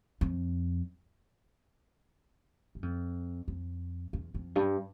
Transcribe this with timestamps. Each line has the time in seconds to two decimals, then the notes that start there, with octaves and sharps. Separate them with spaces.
0.21 F2
2.75 F#2
2.83 F2
3.48 F2
4.13 E2
4.35 F2
4.56 G2